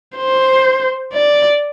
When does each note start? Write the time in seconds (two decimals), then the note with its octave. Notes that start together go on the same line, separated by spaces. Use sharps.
0.17 C5
1.13 D5